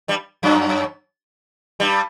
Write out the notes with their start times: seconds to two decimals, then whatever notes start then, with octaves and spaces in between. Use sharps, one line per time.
0.08 G2 G3
0.43 F#2 F#3
1.80 G2 G3